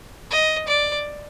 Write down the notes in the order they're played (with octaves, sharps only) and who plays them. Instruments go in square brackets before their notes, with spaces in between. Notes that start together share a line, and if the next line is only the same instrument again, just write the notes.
[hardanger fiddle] D#5
D5